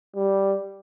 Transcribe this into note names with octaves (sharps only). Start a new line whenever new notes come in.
G3